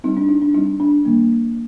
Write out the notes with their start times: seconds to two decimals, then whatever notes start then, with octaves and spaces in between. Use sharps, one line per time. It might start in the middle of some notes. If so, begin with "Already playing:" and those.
0.04 G3 C4 D#4
0.17 D4
0.29 D#4
0.42 D4
0.54 G3 C4 D#4
0.80 D4
1.05 D#3 G3 A#3